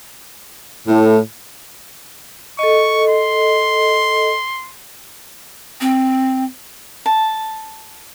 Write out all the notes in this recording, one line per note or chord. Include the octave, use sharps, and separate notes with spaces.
A2
A4 D#5 C#6
C6
C4
A5